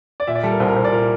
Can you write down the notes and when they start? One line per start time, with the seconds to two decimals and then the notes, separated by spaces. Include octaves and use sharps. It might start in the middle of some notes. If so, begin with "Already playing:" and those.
0.20 D5
0.27 A#2 E5
0.35 D5
0.43 G3 A4
0.51 A#4
0.60 C2 C5
0.68 A#4
0.76 C2 C5
0.84 D5
0.92 A#2 A#4